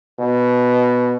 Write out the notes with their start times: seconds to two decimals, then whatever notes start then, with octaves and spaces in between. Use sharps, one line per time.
0.19 B2